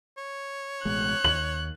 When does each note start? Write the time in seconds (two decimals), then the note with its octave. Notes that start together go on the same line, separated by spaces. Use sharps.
0.18 C#5
0.85 A1 B2 G#3 F#6
1.24 D#2 F#7